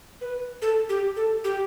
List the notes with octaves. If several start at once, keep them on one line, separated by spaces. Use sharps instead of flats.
B4
A4
G4
A4
G4